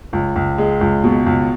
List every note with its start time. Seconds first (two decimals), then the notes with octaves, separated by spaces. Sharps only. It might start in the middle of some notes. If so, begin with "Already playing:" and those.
0.13 C#2
0.36 C#2
0.58 G#3
0.81 C#2
1.04 B2
1.26 C#2